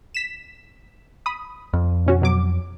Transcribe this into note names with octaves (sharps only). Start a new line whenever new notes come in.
B6 E7
B5 D#6
F2
B2 C#4 F#4
B2 F#3 D6